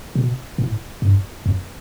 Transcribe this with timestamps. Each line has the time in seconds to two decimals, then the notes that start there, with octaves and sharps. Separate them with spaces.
0.15 B2
0.58 A2
1.02 G2
1.46 F2